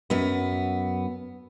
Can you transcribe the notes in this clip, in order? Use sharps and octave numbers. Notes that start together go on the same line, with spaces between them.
F#2 B3